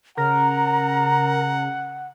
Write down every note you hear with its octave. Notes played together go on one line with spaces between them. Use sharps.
C#3 A#4 F#5 A#5